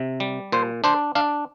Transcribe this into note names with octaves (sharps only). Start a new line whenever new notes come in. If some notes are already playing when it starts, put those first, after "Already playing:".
Already playing: C3
G3
A#2 C5
D4 C5
D4 F5